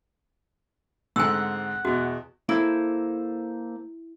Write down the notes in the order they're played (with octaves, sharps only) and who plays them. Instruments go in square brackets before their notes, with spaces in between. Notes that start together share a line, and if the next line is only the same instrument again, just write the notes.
[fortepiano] G#2 D3 C4 [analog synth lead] F#5 [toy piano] G#5 E6
[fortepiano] E2 B2 [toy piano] F#4
[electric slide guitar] A#3 A4 C5 [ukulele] E4